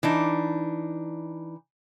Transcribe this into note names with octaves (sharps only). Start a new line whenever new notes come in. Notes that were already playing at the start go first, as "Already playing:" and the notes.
E3 D4 D#4